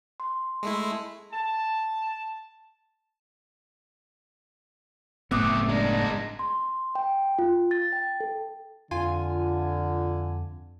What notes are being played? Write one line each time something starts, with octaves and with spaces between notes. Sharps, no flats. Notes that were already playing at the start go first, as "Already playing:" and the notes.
C6
G#3 A3 E4
A5
F#1 A2 A3 B3 C4 D6 D#6 F#6
G#3 D4 A#4
C6
G5
F4
A6
G5
A4
F2 D3 F4 G#5